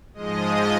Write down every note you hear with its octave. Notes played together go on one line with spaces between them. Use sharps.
G#2 F3 G#3 D#5